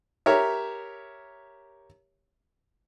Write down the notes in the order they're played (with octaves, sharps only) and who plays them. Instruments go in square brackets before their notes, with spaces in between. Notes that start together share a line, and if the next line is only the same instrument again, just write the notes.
[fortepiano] G4 A#4 C#5 E5